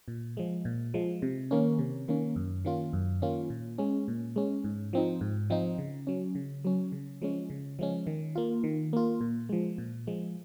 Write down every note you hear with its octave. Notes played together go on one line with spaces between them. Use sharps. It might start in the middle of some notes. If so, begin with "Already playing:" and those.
A#2
F3 G#3
A#2
F3 G#3
C3
D#3 A#3 C#4
C3
D#3 A#3 C#4
F#2
D#3 A#3 C#4 F4
F#2
D#3 A#3 C#4 F4
A#2
G#3 C#4
A#2
G#3 C#4
G#2
F3 C4 D#4
G#2
F3 C4 D#4
C#3
F#3 C#4
C#3
F#3 C#4
C#3
F3 G#3 C#4
C#3
F3 G#3 C#4
D#3
A#3 F4
D#3
A#3 F4
A#2
F3 G#3
A#2
F3 G#3